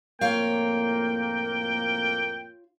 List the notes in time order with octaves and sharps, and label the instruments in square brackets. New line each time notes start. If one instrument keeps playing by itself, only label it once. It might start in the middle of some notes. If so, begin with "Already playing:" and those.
[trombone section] F2 A2 A#3 [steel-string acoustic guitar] F4 C#5 F5 [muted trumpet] G5